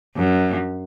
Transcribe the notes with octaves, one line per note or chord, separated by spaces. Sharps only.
F#2